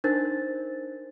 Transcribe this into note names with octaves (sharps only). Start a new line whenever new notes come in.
D4 D#4 A#4 C5 A6